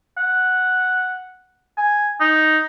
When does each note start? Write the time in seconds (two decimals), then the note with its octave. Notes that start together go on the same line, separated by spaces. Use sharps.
0.17 F#5
1.77 G#5
2.20 D#4